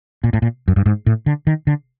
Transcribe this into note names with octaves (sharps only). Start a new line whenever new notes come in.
A#2
A2
A#2
F#2
G2
G#2
A2
D3
D#3
D3